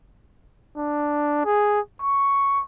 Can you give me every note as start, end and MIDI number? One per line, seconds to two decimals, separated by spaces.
0.77 1.44 62
1.45 1.80 68
2.01 2.62 85